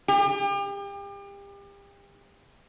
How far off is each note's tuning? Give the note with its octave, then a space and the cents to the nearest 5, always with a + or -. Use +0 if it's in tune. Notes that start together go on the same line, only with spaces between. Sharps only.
G4 +35